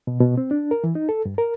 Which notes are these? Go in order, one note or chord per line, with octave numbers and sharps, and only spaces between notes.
B2
B2
C4
D4
A#4
E3
D#4
A4
G2
A#4